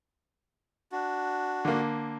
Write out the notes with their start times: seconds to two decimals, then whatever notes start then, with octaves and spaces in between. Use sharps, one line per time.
0.92 D4 F#4
1.65 D3 A#3